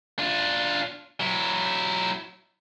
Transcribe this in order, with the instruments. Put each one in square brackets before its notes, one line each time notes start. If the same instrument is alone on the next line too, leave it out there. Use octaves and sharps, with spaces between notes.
[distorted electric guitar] D4 F4
F#3 E4